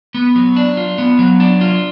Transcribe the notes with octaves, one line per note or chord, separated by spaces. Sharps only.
B3
F#3
D4
F4
B3
F#3
D4
F4